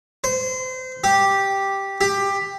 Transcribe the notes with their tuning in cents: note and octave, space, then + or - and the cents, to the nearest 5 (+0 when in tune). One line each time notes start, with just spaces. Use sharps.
C5 -30
G4 +0
G4 +15